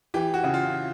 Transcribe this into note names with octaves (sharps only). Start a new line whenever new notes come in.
E3 G4
F#4
C#3
F4